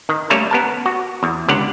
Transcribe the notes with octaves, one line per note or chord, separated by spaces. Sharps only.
D#3
G3 A3 A#3 C#4 C#5
B3 A#4 A5
F#4
E2
C#2 D3 G4 F#5